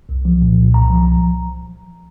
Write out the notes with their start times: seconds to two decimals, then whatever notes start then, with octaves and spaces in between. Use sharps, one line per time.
0.09 C2
0.25 F3
0.42 A#2
0.58 C2
0.74 C2 A#5
0.90 F3